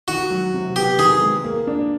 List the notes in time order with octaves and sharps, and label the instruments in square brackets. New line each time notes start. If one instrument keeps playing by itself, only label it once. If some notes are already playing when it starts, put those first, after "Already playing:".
[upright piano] D#3 [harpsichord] F#4
[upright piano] F#3
C3
[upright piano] B3 [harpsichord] G4
[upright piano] D#3 [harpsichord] G#4
[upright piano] G#3
A#3
D4